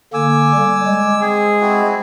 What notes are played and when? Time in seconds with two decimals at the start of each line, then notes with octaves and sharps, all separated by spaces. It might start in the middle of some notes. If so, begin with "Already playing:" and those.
0.14 D3 A#3 G#5 D6 E6
0.54 G3
0.86 G#3
1.21 C4 G#4
1.60 C4 E4 F#4